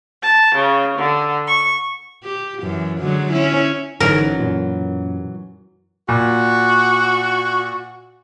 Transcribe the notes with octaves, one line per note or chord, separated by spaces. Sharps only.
A5
C#3
D3
C#6
G4
F#2 E3
D3 F#3 G#3
C#4 E4
G1 E3 F#3 C#4 D#4 A#4
F#2 A#2
A#2 F#4